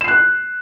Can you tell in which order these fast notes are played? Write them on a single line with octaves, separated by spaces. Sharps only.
E7 C7 F#6